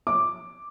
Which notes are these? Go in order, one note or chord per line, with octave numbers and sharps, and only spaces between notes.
D6